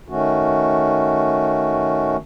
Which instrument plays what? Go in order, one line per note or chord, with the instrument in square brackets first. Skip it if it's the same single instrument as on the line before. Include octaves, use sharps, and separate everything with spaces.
[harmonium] D#3 A3 C#4 F#4